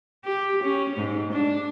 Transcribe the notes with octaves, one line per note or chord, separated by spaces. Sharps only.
G4
C#4
G#2
D4